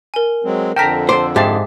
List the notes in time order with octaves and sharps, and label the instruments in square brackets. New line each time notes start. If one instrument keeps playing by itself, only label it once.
[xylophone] A#4 G#5
[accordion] F#3 G#3 C4
[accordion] F2 D3 [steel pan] G5 A#5 [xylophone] A5 F6 B6
[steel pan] A4 D6 [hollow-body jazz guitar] C5
[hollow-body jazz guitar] G#2 [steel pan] G4 G#4 A5 [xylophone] E5 F5 D6